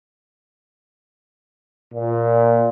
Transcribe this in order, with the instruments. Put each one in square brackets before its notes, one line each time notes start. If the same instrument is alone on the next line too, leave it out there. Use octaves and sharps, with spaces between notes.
[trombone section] A#2